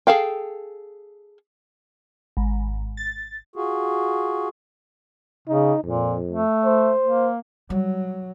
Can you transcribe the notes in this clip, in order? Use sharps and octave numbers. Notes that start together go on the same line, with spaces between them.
G#4 A4 F5 G5
G#1
A6
F4 F#4 G#4
C#3 D#4
F2 A#2
A3
C5
A#3
F#3 G3